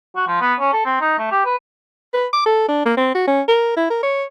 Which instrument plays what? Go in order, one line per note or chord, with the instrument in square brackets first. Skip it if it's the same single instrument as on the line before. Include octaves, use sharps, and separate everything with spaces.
[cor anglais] F#4
F3
B3
C#4
A4
C4
D#4
A3
G4
B4
[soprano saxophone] B4
D6
A4
D4
A#3
C4
F#4
C#4
A#4
E4
A#4
C#5